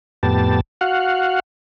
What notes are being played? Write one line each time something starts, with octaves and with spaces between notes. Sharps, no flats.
F2 A2 B3 G4 A5
F#4 F5 F#5